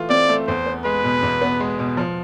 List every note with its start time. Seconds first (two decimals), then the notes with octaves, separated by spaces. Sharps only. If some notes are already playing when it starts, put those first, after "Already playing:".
Already playing: E3 A3 F4
0.10 C4 D5
0.29 A3
0.47 E2 C5
0.66 B3
0.85 G#3 B4
1.04 B2
1.23 E2
1.41 B3
1.60 G#3
1.79 B2
1.97 F3